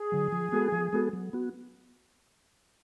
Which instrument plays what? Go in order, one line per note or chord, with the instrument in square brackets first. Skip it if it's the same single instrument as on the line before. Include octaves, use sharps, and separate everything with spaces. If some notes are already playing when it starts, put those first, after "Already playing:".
Already playing: [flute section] G#4
[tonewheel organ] D3 F#3
F3
G#3 B3 F#4 A4
F3
G#3 B3 F#4 A4
F#3
B3 F#4